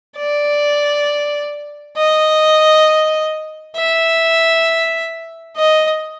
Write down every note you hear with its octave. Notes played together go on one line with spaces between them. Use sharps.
D5
D#5
E5
D#5